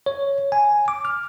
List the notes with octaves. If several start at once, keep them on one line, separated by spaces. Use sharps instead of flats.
C#5
G#5
D6
F6